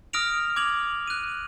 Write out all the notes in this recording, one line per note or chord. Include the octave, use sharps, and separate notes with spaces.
D#6 F6 A#6 D7 F7
D6 G#6 F7 F#7
F#6 D#7